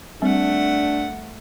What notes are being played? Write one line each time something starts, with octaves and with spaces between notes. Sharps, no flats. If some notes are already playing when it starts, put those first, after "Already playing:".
G3 A3 C4 D4 F#5